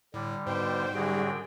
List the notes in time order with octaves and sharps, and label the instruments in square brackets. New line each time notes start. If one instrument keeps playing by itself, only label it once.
[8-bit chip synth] A2 [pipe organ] D3 G3
[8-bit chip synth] G#2 [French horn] B2 [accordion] C5 G5
[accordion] F#2 F#4 G#4 [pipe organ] D3 G5 [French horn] G3